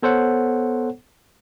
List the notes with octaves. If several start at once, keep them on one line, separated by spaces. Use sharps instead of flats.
B3 A4 C5 C#5 F#5